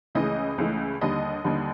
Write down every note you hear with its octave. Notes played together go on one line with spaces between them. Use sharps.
C#2 C#3 E3 A3 D#5
C#2 C#3 E3 A3
D#2 D3 G3 D#5
D#2 D3 G3